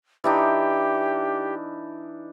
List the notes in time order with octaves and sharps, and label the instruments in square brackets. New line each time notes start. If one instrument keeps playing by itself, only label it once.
[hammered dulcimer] E3 D4 D#4 [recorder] G4